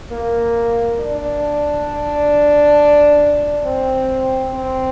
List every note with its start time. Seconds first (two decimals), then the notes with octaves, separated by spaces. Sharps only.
0.11 A#3
1.00 D4
3.66 C4
4.54 C4